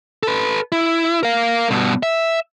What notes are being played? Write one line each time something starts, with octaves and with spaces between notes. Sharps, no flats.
A4 B4
E4
A#4 F5
G2 B2
E5